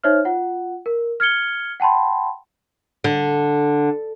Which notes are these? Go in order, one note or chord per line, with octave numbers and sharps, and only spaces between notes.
D#4 C5 C#5 E5 F6
F4 F#5
A#4
F6 G#6 C#7 G7
F#5 G5 A5 B5 C6
D3